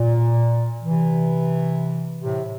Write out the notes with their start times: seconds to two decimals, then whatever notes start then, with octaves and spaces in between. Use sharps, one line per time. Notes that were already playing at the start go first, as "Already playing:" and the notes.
Already playing: A#2
0.82 C3 E3
2.21 A2 C3